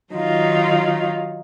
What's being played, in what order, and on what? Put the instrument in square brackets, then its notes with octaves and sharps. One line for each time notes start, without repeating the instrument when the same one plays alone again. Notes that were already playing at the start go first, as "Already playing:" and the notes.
[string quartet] D#3 F#3 D#4 F4